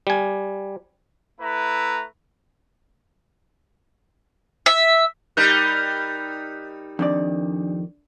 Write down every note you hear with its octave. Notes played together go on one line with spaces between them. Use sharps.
G3 G#5
A3 E4 B4 A#5
E5
G3 D#4 A#4 F#6 G6 B6
F2 D#3 D4 D5